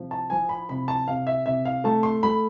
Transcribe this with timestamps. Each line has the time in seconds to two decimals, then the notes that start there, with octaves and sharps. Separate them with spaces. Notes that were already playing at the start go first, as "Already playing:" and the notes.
Already playing: C3 F3
0.11 A5
0.30 F3 G#5
0.49 B5
0.69 C3 B5
0.88 A5
1.08 C3 F5
1.27 E5
1.46 C3 E5
1.65 F5
1.84 A3 A5
2.03 C6
2.23 A3 B5